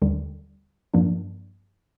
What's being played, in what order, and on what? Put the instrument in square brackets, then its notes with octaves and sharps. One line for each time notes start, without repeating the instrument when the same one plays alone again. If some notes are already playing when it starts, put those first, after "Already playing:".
[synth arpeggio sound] D#2 D3 G3
G2 F3 A#3 D4